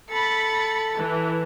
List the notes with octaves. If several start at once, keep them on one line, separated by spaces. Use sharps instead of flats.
A4 B5 A6 C#7
E3